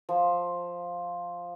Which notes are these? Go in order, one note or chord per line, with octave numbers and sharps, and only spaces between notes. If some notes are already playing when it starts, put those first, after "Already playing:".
F3